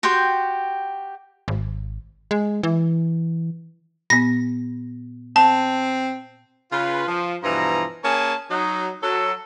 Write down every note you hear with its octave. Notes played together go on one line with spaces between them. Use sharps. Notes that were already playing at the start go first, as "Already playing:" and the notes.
F#4 G4 G5 C6
G#1
G#3
E3
A#2 B3 A#6
C4 A5
C#3 F4 B4
F3
G2 B2 E3 F3 A#5
A#3 C#4 G#4 C#5 G#5 A5
F#3 D#4
F#3 A4